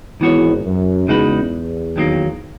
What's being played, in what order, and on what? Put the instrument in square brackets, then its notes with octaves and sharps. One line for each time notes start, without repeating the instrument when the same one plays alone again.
[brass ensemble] G#1 G#2 [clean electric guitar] E3 B3 F#4 C#5
[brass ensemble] F#2
[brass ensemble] E2 [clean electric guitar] C#3 G#3 D#4 F#4 B4
[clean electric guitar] D#2 D#3 F#3 A#3